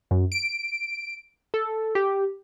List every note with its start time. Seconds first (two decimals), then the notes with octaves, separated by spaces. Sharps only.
0.11 F#2
0.32 D7
1.54 A4
1.95 G4